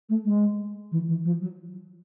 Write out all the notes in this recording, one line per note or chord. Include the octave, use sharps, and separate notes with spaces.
A3
G#3
E3
E3
F3
F#3